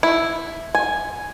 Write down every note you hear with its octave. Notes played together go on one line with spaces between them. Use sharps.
E4
G#5